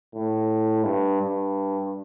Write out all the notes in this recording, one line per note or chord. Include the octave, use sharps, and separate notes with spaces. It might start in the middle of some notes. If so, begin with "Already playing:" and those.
A2
G2
G2